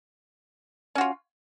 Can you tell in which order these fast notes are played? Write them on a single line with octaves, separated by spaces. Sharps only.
C#4 F#4 F4